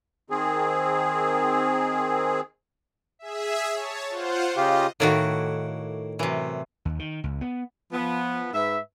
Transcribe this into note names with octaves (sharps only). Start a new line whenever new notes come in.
D#3 C4 G#4
G#4 E5
C#5 A5
F4 C5 F#5
C#3 F4 G4 D#5
A2 D#3 A3 A#3 E4 F#4
F#2 C3 E3
D#2
D#3
C#2
B3
F3 B3
G#2 B4 E5